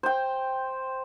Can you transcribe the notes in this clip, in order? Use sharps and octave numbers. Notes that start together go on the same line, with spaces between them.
C5 G5